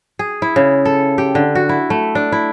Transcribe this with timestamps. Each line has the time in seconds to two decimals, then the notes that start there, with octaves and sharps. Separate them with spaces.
0.19 G#4
0.42 E4
0.56 C#3
0.85 A4
1.18 G4
1.35 D3
1.55 F#4
1.69 E4
1.90 A3
2.15 D4
2.32 E4